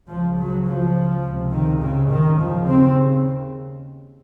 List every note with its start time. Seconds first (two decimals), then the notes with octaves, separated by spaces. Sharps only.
0.08 C#2 C#3 F3
0.38 F#3
0.67 F3
1.24 C#2 C3
1.53 D#3
1.82 C#3
2.11 D#3
2.40 D#2 C#3 F3
2.69 C4